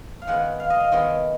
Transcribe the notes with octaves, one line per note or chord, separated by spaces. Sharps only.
F5
D#3 G#3 B3 F#5
F5
D#5
F5
D#3 G#3 B3 D#5